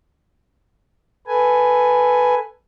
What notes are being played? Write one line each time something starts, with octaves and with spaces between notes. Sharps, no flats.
A4 B4 G#5